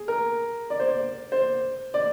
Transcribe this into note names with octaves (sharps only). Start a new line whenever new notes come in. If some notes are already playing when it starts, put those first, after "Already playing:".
Already playing: G#4
A#4
D5
C5
D5
C5
D5